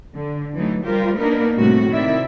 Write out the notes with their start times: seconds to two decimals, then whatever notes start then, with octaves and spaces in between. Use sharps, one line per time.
0.13 D3
0.54 E3 F#3 A3 D#4
0.84 G3 F4 G4 A#4 C5
1.16 A#3 B3 D4 D#4 A#4 B4
1.58 A2 C3 G3 A3 F#4
1.89 C3 D#3 E4 D5 E5